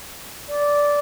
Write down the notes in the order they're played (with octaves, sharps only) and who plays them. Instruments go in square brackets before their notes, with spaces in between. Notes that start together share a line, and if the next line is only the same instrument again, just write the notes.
[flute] D5